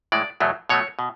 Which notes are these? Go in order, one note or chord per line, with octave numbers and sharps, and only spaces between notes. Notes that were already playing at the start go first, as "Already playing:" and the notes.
A2 E3 G#3 D5
E2 B2 F#3 A3
B2 F#3 A3 C#5
B2